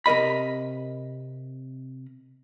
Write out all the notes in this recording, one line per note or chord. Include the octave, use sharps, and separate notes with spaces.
C3 A#4 D#5 B5